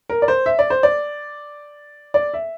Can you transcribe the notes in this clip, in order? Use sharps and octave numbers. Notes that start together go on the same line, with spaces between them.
A#4
D5
C5
E5
D5
C5
D5
D5
E5